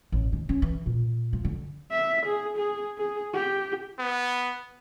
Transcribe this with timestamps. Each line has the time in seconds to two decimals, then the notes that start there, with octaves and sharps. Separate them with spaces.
0.12 A1
0.32 D#3
0.49 C#4
0.62 E3
0.86 A#2
1.33 F3
1.45 D3
1.91 E5
2.26 G#4
2.57 G#4
2.97 G#4
3.34 G4
3.99 B3